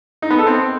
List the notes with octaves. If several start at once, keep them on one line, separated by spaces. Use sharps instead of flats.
D#4
B3
A4
C4